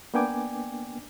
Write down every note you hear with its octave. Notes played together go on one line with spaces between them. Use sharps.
A#3 B3 D4 G5 G#5 D6